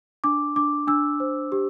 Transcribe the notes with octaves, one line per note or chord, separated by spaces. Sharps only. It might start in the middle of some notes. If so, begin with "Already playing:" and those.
D4 D6
D4 D6
D4 E6
C5
G4